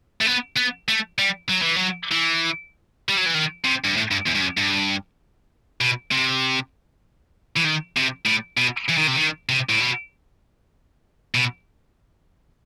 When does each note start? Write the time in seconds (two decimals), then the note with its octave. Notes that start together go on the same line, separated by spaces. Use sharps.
0.21 A3
0.27 B3
0.57 B3
0.89 A3
1.19 G3
1.50 F#3
1.62 E3
1.76 F#3
2.12 E3
3.09 G3
3.17 F#3
3.26 E3
3.35 D#3
3.65 C3
3.84 G2
3.96 A2
4.11 G2
4.26 E2
4.35 G2
4.41 F#2
4.58 G2
5.81 B2
6.11 C3
7.57 E3
7.65 D#3
7.96 C3
8.26 A2
8.57 B2
8.88 E3
8.97 D#3
9.07 C3
9.17 D#3
9.49 C3
9.69 A2
9.80 B2
11.35 B2